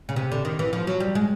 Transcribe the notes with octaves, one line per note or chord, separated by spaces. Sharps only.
C#3
C3
D3
D#3
E3
F3
F#3
G3
G#3